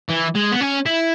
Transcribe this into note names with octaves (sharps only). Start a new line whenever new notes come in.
E3
G#3
B3
C#4
E4